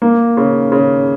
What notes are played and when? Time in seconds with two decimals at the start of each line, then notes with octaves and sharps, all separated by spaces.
0.02 A#3
0.37 C#3
0.72 C#3